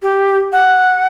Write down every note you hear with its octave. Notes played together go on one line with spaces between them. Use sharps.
G4
F#5